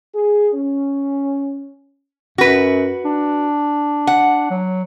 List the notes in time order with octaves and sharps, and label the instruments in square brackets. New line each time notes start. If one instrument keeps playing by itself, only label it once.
[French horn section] G#4
C#4
[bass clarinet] F#2 [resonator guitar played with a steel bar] F#4 B4
[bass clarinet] D4
[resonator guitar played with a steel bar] F#5
[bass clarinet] F#3